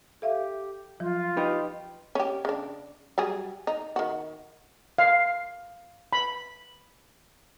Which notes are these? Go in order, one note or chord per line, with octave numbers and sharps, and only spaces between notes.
G4 A4 E5 F5
F3 F#3 F4
D#4 G4 B4
C#4 G4
C#3 D4
F#3 G3 G#4
D#4
D#3 F#4
F5
B5